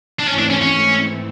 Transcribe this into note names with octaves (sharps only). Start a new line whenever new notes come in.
D4
G#2 E3 A3 C4 C#4 E4
D4
C#4
C#4